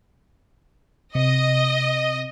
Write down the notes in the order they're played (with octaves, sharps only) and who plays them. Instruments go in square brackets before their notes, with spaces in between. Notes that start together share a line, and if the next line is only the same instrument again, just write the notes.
[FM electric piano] C3 [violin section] D#5